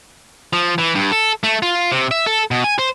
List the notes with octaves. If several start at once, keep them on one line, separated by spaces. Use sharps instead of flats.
F3
E3
G2
A4
A3
F4
C3
E5
A4
B2
G#5
C5